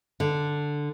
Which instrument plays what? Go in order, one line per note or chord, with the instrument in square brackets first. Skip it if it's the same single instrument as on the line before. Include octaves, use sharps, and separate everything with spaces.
[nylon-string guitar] D3